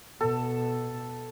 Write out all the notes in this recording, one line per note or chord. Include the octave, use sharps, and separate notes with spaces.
B2 A4